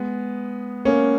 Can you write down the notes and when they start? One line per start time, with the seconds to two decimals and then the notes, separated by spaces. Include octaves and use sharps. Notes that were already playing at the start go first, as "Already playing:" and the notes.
Already playing: G#3 B3
0.85 A#3 C#4